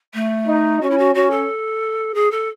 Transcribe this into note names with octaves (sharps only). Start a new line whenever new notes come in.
A3
D#4
C#4 F#4
E4
F#4
C#4 F#4
A4
G#4
A4